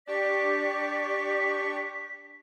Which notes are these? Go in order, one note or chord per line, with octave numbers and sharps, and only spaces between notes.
D4 G4 D5 C#6 B6